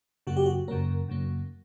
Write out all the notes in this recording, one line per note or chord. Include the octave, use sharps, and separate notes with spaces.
F#2 C#3 F#3 A#3 F#4
G4
F#4
F#2 C#3 F#3 A#3 A#4
F#2 C#3 F#3 A#3